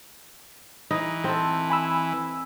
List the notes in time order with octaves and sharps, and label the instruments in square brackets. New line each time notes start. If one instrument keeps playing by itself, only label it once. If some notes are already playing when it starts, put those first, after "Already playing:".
[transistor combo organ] E3 [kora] D#4
[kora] C4 A4
[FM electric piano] G#5 B5 E6